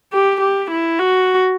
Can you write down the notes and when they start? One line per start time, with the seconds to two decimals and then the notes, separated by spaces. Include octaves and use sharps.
0.12 G4
0.41 G4
0.71 E4
0.99 F#4